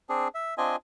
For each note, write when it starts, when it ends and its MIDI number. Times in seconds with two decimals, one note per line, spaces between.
0.09 0.28 60
0.09 0.28 62
0.09 0.28 68
0.35 0.54 76
0.58 0.76 60
0.58 0.76 62
0.58 0.76 65
0.58 0.76 75
0.58 0.76 80